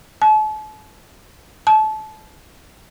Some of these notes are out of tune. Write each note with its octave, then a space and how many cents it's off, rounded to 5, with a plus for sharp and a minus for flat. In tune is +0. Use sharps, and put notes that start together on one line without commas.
A5 -40
A5 -25